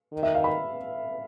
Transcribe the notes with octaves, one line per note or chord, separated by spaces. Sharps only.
D#3
E5
F5
B5